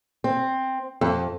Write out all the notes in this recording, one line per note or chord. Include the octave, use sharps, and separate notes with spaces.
C4
F2